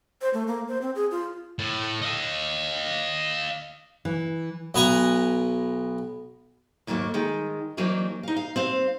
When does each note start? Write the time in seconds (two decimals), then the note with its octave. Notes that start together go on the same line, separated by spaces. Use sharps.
0.22 C5
0.34 A3
0.47 A#3
0.68 C5
0.81 C4
0.95 G#4
1.11 F4
1.59 A2
2.02 D#5 F5
4.05 E3
4.74 B1 B3 G#5 A#5
6.87 D#2 G#2 F#3 A3 A#3
7.14 D#3 G#3
7.77 E3 F#3 A#3 C4 D4 D#4
8.23 D#4 F5
8.36 F5
8.56 C4 C5 F5